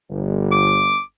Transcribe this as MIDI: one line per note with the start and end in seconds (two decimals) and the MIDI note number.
0.10 0.97 31
0.52 1.01 86